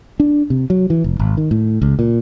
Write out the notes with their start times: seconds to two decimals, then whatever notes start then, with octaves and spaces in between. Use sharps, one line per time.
0.20 D4
0.50 C3
0.70 F#3
0.90 E3
1.04 F1
1.19 G#1
1.37 D#3
1.51 A2
1.82 C#2
1.99 A#2